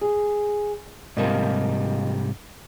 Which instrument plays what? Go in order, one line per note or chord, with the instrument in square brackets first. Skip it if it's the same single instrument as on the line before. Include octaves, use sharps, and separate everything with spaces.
[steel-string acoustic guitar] G#4
[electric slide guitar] G#2 C3 G3 [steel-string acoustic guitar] F3 A#3 D#5